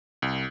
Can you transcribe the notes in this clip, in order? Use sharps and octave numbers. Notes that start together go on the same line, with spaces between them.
C2